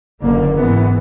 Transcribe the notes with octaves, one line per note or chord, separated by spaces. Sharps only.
F#1 D3 A#3
G#2 E3 B3